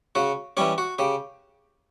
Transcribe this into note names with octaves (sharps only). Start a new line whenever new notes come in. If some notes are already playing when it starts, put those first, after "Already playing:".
C#3 F#4
E3 G3 C#4 G4
F#4
C#3 G4